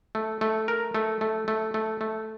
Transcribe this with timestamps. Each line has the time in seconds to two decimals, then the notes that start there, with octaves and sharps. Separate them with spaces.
0.15 A3
0.41 A3
0.68 A#4
0.95 A3
1.21 A3
1.48 A3
1.74 A3
2.01 A3